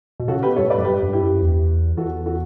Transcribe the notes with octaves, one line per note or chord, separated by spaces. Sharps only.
B2
C#3 F#4 A4
G4 B4
B2
G2 A4 C#5
A2 B4 D5
F#2
G2 G4 B4
G2
E4 G4
F#2
E2
E2 F#4 A4
F#4 A4